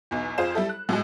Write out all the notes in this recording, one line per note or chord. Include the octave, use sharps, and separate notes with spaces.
B1 E2
F2 F4 G#4 C5 E7
G3 E4 A4
F#6
A2 F#3 G#3